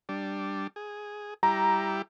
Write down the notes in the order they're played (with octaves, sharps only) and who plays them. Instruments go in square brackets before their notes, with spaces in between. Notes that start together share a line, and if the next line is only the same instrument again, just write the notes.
[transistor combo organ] G3 D4
G#4
[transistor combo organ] G3 E4 G4 [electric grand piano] A#5